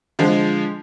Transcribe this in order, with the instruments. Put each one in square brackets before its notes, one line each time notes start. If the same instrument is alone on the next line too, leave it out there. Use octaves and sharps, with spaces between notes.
[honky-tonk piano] D3 F3 G#3